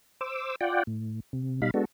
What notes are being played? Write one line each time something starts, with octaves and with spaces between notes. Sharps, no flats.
C5 D6 E6
F4 D5 F#5 G5
A2
C3
B2 G3 D#4 F5 B5
G#3 B3 D4 F#4 A4